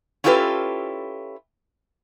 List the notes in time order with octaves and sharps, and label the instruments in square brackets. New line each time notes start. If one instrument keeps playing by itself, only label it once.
[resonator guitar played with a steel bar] C#4 E4 F4 G4 A4 B4